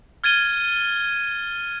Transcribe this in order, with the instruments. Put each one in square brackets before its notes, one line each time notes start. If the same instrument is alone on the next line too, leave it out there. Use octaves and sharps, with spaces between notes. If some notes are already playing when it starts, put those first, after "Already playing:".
[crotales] F6 G#6 A6 D#7 G7